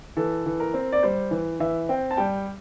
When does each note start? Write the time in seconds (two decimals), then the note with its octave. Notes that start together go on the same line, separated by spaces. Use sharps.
0.17 E3 A4
0.46 E3
0.60 A#4
0.74 C4
0.92 D5
1.03 G3 C5
1.31 E3
1.60 E3 E5
1.89 C4 G5
2.11 A5
2.17 G3 G5